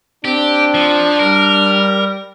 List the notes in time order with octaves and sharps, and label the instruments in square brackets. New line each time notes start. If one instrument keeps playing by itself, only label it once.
[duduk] C4 [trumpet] D4 [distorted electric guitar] G4
[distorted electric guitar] F3
[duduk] G3 [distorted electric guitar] A#4